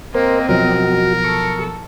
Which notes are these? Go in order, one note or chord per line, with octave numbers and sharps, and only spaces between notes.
A#3 C4 A#4 C5 D#5
B2 F3 F#3 F#4 A#4
A4 C#6